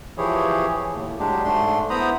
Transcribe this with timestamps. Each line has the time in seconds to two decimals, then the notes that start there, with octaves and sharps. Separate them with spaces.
0.18 E3 F3 E4 G4 G#4 C#5
0.94 D#2 A2
1.19 F#3 G#3 D4 G4
1.44 G#2 A3 D4 C6
1.90 B3 E4 C5 A#5 B5 D#6